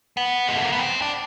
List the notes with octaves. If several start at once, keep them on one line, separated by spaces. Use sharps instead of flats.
B3
G#3
A3
A#3
B3
C4
D4